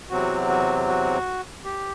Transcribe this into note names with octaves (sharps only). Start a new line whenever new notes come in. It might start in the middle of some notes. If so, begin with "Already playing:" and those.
E2 C3 F#3 C4 F#4
F#4
F#4
G4